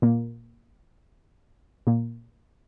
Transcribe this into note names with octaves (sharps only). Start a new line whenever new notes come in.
A#2 A#3
A#2 A#3